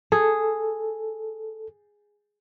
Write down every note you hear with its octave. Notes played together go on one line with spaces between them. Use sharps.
G#4 A4